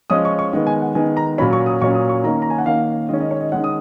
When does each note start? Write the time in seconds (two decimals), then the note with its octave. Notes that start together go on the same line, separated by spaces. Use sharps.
0.10 F3 G#3 C#4 D#6
0.25 C#6
0.39 C#6
0.53 D#3 G#3 B3
0.67 G#5
0.82 F#5
0.95 D#3 G#3 B3 G#5
1.17 A#5
1.38 A#2 F#3 C#4 B5
1.53 C#6
1.66 D#6
1.81 A#2 F#3 C#4 C#6
1.95 D#6
2.09 C#6
2.24 D#3 A#3 C#4 A#5
2.42 A#5
2.50 G#5
2.58 F#5
2.66 D#3 A#3 C#4 F5
3.09 D#3 G#3 C#4 D#5
3.20 D#5
3.31 C#5
3.41 D#5
3.52 D#3 G#3 C#4 F#5
3.64 D#6